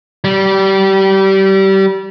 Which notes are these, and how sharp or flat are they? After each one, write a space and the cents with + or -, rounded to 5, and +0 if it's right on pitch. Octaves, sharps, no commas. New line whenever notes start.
G3 -25